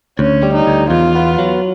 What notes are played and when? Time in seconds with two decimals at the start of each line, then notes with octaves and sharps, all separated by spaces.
0.19 D2 C#4
0.43 G3
0.54 D#4
0.67 D2
0.90 E2 F4
1.15 B3
1.39 F#3